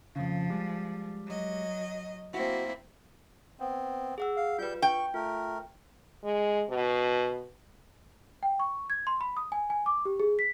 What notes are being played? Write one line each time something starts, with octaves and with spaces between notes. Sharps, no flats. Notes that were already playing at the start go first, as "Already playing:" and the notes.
F2 C#3 F3
G3 G#3
F#3 D#5
A#3 C4 E4 F#4
B3 C4
G#4 F#5 E6
F5
G3 F4 B4 G6
G5 C#6
A3 F4 A#4
G#3
B2
G5
C#6
G#6
C6
B5
D#6
G#5
G#5
D6
G4
G#4
B6